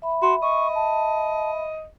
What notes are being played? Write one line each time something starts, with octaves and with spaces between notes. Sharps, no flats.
E5 B5
F#4 C6
D#5 C#6
A5